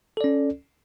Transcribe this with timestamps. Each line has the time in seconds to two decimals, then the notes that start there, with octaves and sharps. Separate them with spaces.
0.17 A4
0.21 D5
0.24 C#4